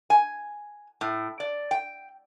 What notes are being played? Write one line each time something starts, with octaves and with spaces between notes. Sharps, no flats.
G#5
A2
D5
G5